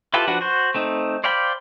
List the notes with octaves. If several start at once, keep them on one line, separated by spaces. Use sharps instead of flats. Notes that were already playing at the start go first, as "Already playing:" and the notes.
E4 F4 G4 A4 B4
F3 D4 F#4 B4 F#5
F#4 C5
A3 C4 D#4
C5 D5 F5 G5 B5